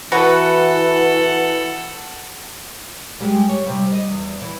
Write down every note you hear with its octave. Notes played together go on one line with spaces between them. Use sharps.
E3 F#4 A4 B4 F#5
G3 G#3
C#5
C3 G3
D#5
E2
E3